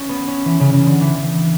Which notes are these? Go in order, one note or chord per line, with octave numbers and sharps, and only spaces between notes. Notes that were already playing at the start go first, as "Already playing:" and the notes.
Already playing: C#4
B3
C#4
E3
C#3
C#3
D3
E3